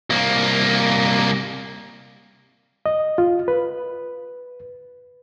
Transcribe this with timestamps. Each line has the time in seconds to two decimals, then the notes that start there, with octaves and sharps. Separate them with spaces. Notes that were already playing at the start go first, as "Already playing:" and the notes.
0.10 C2 A#3
2.86 D#5
3.18 F4
3.48 B4